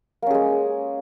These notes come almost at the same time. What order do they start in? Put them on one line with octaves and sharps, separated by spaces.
A#3 C#4 G#4 G#3